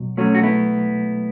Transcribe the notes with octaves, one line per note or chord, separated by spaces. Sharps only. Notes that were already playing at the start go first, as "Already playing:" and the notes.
Already playing: B2 F#3
F#3 A3 C#4
F#4
A3 B3 E4